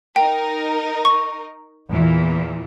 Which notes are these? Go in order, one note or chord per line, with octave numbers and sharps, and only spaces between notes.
D#4 A#4 G5
C#6
E2 A#2 E3